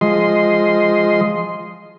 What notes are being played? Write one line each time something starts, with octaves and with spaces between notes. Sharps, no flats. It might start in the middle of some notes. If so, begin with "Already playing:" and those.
F3 G#3 D#5 C6